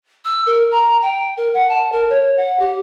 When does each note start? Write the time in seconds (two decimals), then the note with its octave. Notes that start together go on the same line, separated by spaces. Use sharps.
0.25 E6
0.47 A#4
0.72 A#5
1.02 G5
1.37 A#4
1.54 F#5
1.69 A5
1.92 A#4
2.10 C#5
2.37 F#5
2.59 G4